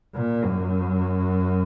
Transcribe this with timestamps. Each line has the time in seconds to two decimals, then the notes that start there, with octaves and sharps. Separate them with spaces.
0.15 A#2
0.44 F#2